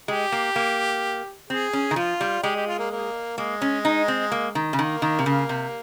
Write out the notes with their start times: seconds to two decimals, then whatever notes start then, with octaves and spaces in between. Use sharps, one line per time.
0.08 G#3 G4
0.32 A#3
0.56 A#3
1.50 C4 G#4
1.73 C#4
1.91 D#3
1.96 F3 F4
2.21 G3
2.43 G#3 G4
2.56 G4
2.67 F4
2.79 A#3
2.91 A#3
3.38 G#3 A#3
3.62 C#4
3.85 D#4
4.08 C4
4.32 A#3
4.55 D#3
4.73 C#3
4.78 D#3 A#3
5.02 D#3
5.19 C3
5.26 C#3
5.49 C3